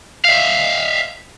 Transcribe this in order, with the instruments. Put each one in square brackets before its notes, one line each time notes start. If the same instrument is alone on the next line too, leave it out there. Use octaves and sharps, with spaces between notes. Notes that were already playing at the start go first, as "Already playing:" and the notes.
[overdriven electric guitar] E5 F5